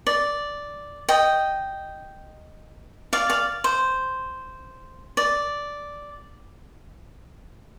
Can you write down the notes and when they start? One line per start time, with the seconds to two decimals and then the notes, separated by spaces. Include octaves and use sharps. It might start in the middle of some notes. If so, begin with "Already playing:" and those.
0.07 D5
1.09 D#5 G5
3.13 D5 F5
3.30 D5 F5
3.64 C5
5.17 D5